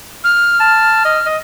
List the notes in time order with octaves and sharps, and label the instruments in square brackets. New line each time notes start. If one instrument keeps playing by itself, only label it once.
[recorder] F6
[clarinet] A5
D#5
D#5